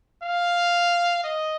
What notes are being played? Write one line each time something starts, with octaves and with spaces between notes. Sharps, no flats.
F5
D#5